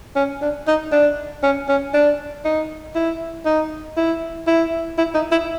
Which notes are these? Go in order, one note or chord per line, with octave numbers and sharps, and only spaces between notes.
C#4
D4
D#4
D4
C#4
C#4
D4
D#4
E4
D#4
E4
E4
E4
D#4
E4